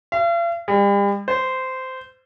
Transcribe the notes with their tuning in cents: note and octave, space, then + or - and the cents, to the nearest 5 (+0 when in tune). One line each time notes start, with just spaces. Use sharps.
F5 -45
G3 +40
C5 -15